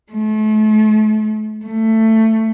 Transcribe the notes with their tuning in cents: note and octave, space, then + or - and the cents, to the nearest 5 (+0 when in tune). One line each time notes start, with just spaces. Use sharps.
A3 -35
A3 +15